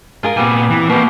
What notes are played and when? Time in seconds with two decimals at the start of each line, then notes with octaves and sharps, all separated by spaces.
0.23 F4 G#4 A#4
0.37 A#2 G3 B3 C4 G#5
0.70 E3
0.89 B2 A#3 B3 G4